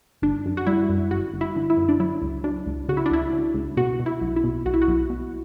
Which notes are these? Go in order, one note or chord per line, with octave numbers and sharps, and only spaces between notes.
G1 D4
F#2
F#4
G3 E4
F#2
G1 F#4
G1
E4
D3
E4
F#2
D4
F#3 E4
C#2
F#3 D4
C#2
C#3 F#4
E4
D4
C#2 E4
C#3
C#2
B2 F#4
B2
E4
B1
E4
B2
B1 F#4
E4
F#4
B1
B2